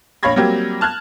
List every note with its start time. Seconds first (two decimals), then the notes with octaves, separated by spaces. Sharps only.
0.23 A#1 C#5 F5 B5 G#6 A#6
0.36 F#3 G3 A#3 C4 G4
0.81 A5 F6 F#6 G#6